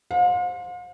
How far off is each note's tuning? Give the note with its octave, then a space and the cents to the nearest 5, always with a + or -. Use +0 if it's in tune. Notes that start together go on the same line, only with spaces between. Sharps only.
C5 +0 F5 +45